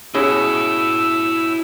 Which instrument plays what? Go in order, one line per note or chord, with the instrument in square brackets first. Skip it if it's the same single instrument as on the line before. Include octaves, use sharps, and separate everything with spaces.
[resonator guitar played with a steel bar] B2 [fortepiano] C#4 G#4 [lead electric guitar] E4 C#5 [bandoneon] E6